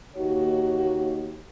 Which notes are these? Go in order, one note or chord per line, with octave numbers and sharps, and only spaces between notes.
D#2 A#3 D#4 F#4 G4 C#5